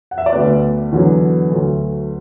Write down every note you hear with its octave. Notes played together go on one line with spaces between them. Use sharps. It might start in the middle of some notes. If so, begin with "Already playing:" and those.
F#5
E5
D5
D2 D3 B3 B4
E2 D3 F#3 B3
D2 D3 F#3 A3